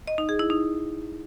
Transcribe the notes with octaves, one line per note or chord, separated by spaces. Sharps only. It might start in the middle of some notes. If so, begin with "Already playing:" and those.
D#5
D#4
G#4
E4
D#4